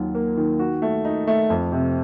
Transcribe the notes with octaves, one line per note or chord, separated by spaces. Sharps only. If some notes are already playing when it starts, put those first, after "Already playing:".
Already playing: D#2 F#3 F4
A#3
D#3
F#4
A3
D#4
A3
F2
C3